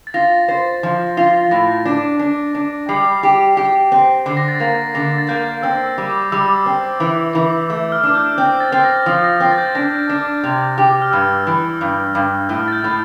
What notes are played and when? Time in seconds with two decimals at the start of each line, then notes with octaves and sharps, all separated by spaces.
0.07 A6
0.14 F4 A#6
0.48 C5
0.83 F3
1.17 F4
1.51 A2 A#6
1.85 D4
2.19 D4
2.55 D4
2.89 G3 C7
3.23 G4
3.57 G4
3.92 C4
4.26 D3 C7
4.37 A#6
4.48 A6
4.59 A#3 A#6
4.95 D3 A#6
5.18 A6
5.29 A#3 G6
5.63 C4 E6
5.86 E6
5.98 G3
6.09 D6
6.22 D6
6.32 G3 E6
6.66 C4
7.00 E3
7.35 E3
7.69 A3 E6
7.92 F6
8.03 D4
8.15 G6
8.38 C4 G6
8.60 A6
8.72 C4
8.84 A#6
9.06 F3
9.24 A#6
9.40 C4 A#6
9.52 A6
9.58 G6
9.75 D4 A#6
10.09 D4
10.43 C3
10.78 G4
11.02 F6
11.12 G2 E6
11.47 E3
11.81 G2
12.15 G2
12.49 A2 F6
12.68 A6
12.73 G6
12.84 A2